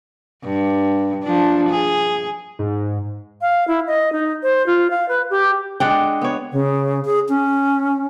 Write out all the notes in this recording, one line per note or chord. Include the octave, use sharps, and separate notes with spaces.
G2
F3 D4
G#4
G#2
F5
E4
D#5
D#4
C5
F4
F5
B4
G4
G#3 D4 F#5 G5
B3 C#5
C#3
G#4
C#4